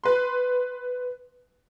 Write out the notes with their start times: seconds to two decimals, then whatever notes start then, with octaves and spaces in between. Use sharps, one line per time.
0.04 B4 C6